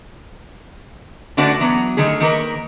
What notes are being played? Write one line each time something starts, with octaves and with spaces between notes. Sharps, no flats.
D3 A3 D4 F#4 B4 D5
E3 F#3 B3
D3 D#3 A3 G#4
D#3 A#3 A#4 B4